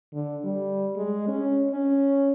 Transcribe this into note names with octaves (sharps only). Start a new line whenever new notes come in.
D3
G3
G#3
C#4
C#4